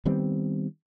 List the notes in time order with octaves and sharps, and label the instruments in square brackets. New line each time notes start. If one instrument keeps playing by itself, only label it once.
[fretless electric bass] D#3 G3 B3 C4